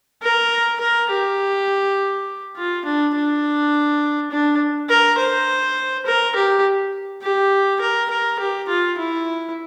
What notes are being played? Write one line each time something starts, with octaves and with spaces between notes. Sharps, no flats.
A#4
A#4
G4
F4
D4
D4
D4
A#4
C5
A#4
G4
G4
A#4
A#4
G4
F4
E4